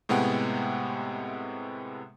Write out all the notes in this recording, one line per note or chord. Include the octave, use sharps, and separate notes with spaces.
A2 C3 G#3 B3 F#5 G5